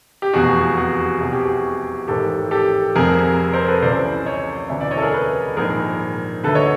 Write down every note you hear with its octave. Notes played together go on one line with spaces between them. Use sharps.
G4
F1 E2 B2 F#4 G#4
F#4 G#4
C2 B2 G#4
G4
F#4 G#4
A1 G#2 D#3 G4 A4
G4 A4
F1 F2 C3 G#4 A#4
A#4 C5
A4 B4
C#2 C#3 E3 C5 D5
C#5 D#5
E1 D2 C#3 E3 D5 E5
D5 E5
C#5 D#5
A4
G#4 A#4
A4 B4
A#1 G#2 D#3 G#4 A#4
D2 D3 A4 B4
C#5 D#5